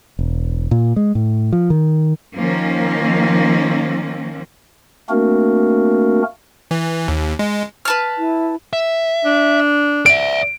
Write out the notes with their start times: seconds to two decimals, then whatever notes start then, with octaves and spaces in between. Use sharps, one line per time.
0.19 E1
0.71 A#2
0.96 G#3
1.15 A2
1.53 F3
1.70 D#3
2.36 D#3 F3 A#3 C#4
5.09 A3 A#3 C4 D4 F#4 A#4
6.71 E3
7.08 D#2
7.39 G#3
7.85 B4 A5 F6
8.18 E4
8.73 E5
9.25 D4
10.06 D5 E5 D7